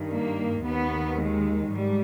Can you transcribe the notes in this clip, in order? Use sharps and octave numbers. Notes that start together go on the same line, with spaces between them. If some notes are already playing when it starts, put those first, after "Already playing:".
Already playing: G2 D#3
A#3
D#2 D#3 B3
G#3
G#2 G3